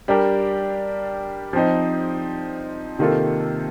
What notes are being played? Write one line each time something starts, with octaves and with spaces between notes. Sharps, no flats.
G3 D4 G4 A#4
F3 C4 D#4
C3 D#3 A#3 F4 A4